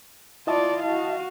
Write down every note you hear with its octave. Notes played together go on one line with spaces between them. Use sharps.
E4 F4 D5 D#5 A5
F#4 F5